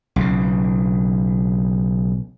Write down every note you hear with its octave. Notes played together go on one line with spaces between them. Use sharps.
B1 C#3